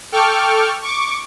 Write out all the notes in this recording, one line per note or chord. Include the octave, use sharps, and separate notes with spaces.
A4 G5 C#6 D6 F6
C#6 D6